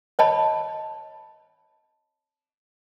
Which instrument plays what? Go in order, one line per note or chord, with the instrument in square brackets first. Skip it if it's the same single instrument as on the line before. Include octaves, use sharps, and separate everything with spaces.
[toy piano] C#5 D#5 A5 B5